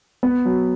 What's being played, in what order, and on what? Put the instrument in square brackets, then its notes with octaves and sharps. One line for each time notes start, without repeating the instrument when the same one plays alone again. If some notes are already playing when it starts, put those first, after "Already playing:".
[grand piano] B3
F#3